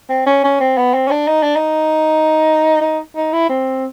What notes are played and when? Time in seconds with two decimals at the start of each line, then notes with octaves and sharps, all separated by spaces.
0.10 C4
0.26 C#4
0.44 C#4
0.60 C4
0.77 B3
0.94 C4
1.07 C#4
1.11 D4
1.28 D#4
1.43 D4
1.56 D#4
2.81 D#4
3.16 D#4
3.33 E4
3.49 C4